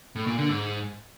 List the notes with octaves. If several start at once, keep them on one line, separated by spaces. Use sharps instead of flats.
A2
A#2
D3
G#2